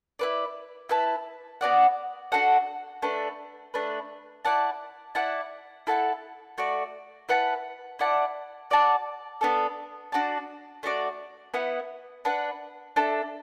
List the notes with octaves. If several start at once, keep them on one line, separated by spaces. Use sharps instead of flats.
E4 B4 D5
E4 B4 E5 A5
B3 F#4 D5 F#5
D4 F#4 A4 F#5
A3 D4 B4
A3 D4 B4
E4 D5 F#5 A5
E4 D5 F#5 A5
E4 A4 F#5 A5
A3 F#4 D5
E4 B4 F#5 A5
E4 D5 F#5 A5
F#4 D5 F#5 A5
B3 D4 A4
D4 F#4 D5 A5
A3 D4 F#4 D5
B3 E4 B4 F#5
D4 B4 F#5
D4 A4 E5 A5